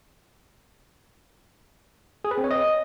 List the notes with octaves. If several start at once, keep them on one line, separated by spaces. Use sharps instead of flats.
G#4
B4
C4
C#5
D#5